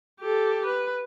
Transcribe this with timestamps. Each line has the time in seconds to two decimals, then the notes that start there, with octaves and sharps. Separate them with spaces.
0.21 G4 A4
0.66 B4